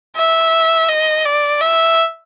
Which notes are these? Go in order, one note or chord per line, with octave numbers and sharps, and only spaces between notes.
E5
D#5
D5
E5